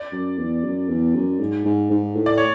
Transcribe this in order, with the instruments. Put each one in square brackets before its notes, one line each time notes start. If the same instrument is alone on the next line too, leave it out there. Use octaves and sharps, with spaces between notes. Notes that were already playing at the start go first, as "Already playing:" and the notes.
Already playing: [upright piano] D5
[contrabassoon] F#2
E2
F#2
E2
F#2
G#2
G#2
G#2
A2
[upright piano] D5
C#5